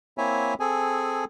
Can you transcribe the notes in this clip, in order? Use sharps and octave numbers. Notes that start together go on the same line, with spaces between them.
A#3 C4 E4 C#5 E5 G#5
C4 G#4 A4 G#5